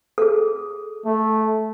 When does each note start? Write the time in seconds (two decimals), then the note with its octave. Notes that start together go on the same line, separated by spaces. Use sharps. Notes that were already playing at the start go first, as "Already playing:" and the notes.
0.18 G#4 A4
1.06 A3